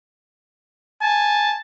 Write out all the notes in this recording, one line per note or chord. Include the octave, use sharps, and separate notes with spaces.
G#5 A5